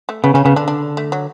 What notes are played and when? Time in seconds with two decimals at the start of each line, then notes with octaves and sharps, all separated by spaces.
0.09 A3
0.24 C#3 B3
0.34 C#3 C#4
0.45 C#3 B3
0.56 D3 D4
0.68 D4
0.97 A3
1.12 F#3